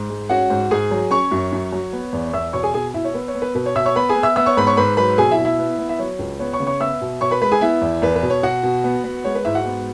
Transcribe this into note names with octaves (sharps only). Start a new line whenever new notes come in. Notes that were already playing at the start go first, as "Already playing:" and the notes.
Already playing: G#2
G#3
C#4 F#4 F#5
G#2
G#2 G#4 G#5
F#3
C#4 C#5 C#6
F#2
F#2
F#3
B3
E2
E2 E5 E6
B2 C#5 C#6
G#4 G#5
B2 G#4 G#5
B2 E4 E5
C#5
B3 B4
C#5
B3
B4
B2 B4
C#5
B2 E5 E6
C#5 C#6
B3 B4 B5
G#4 G#5
B3
E5 E6
B3 E5 E6
C#5 C#6
G#2 B4 B5
C#5 C#6
G#2 B4 B5
F#3 B4 B5
B2 G#4 G#5
E4 E5
B2
E4 E5
B3
B3
E5
F#3 C#5
C#2
B3 C#5
C#5 C#6
C#3
C#5 C#6
B3 E5 E6
B2
B2 C#5 C#6
B4 B5
G#3 B4 B5
G#4 G#5
B3 E4 E5
E2
E2 B4
B4
B2
C#5
B2 F#4 F#5
B2
B3
B3
G#3 C#5
B4
G#2 E4 E5
F#4 F#5
B3